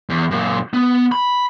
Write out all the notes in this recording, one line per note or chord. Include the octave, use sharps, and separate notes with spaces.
E2
F#2 A#2
B3
B5